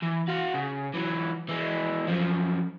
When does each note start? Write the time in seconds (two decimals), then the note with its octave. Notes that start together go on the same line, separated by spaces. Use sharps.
0.03 E3
0.29 F#4 F5
0.55 C#3
0.94 E3 F#3
1.49 E3 G#3
2.08 F#2 F3